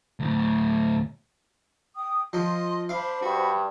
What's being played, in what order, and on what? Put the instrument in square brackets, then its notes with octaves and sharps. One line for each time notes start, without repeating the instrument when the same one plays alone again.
[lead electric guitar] D2 A2
[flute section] G5 D#6
[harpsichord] F3 [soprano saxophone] D#5 [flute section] C6
[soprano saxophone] D4 [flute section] C5 B5 [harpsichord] F5
[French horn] G2 [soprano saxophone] F#4